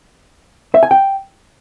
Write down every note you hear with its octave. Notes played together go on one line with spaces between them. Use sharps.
E5
G#5
G5